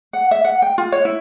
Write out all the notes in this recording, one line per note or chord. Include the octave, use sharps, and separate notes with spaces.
F#5
E5
F#5
G5
F4
C#5
E4